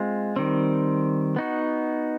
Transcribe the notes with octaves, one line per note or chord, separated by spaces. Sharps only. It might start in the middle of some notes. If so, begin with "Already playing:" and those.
Already playing: G#3 C4 F4
D#3 G3 C4
B3 D#4 F#4